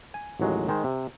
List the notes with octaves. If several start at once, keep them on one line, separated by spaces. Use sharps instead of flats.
G#5
A1 D#2 F#3 G#3
D#3 G#3 C5
C3